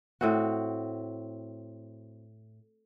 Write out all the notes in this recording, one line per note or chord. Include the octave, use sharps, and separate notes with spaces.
A2 C4 F#4